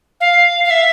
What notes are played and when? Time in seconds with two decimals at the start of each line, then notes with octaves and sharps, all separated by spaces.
0.21 F5
0.65 F5
0.70 E5